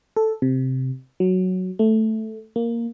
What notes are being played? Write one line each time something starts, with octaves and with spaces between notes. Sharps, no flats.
A4
C3
F#3
A3
A#3